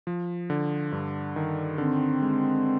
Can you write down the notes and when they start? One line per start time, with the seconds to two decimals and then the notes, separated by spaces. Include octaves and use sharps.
0.07 F3
0.50 D3
0.92 G2
1.36 D#3
1.78 D3 C4
2.22 G#3